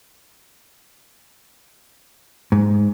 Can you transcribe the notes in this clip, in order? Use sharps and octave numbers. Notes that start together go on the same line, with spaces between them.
G#2